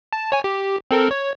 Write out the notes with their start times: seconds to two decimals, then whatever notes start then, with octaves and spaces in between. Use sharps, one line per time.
0.13 A5
0.32 C#5 G#5
0.44 G4
0.91 C4 A4 A#4
1.11 C#5